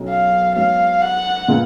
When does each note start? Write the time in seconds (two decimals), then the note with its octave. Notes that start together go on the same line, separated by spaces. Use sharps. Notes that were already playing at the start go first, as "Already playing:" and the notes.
Already playing: B1 B2 F#3 C#4
0.09 F5
0.56 G#2 F#3 B3 F5
1.02 F#5
1.48 A#2 G#3 B3 F4